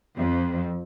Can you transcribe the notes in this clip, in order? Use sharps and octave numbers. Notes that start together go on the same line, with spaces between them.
F2